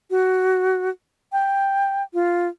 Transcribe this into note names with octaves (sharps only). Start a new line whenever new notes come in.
F#4
G5
F4